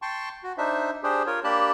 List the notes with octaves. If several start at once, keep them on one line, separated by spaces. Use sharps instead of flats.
G5 A5 C6 C#6
F#4
D4 D#4 C5 E5
D4 G4 G#4 C5
F4 A#4 C#5
A#3 D4 G4 A5 B5